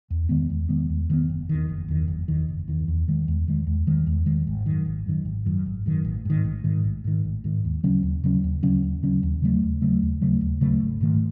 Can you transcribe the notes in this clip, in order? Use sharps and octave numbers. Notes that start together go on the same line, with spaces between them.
E2
D#3 G#3 B3
E2
D#3 G#3 B3
E2
D#3 G#3 B3
F#1
E2 D#3
F#1
E2 D#3
F#1
E2 D#3
F#1
E2 D#3
E2
D#3 G#3
E2
D#3 G#3
E2
D#3 G#3
E2
D#3 G#3
G#1
F#2 D#3
G#1
F#2 D#3
G#1
F#2 D#3
G#1
F#2 D#3
A1
G#2 D#3
A1
G#2 D#3
A1
G#2 D#3
A1
G#2 D#3
D#2
C#3 F#3 C#4
D#2
C#3 F#3 C#4
D#2
C#3 F#3 C#4
D#2
C#3 F#3 C#4
D#2
C#3 F#3 A3
D#2
C#3 F#3 A3
D#2
C#3 F#3 A3
D#2
C#3 F#3 A3
G#1
G#2 D#3 A3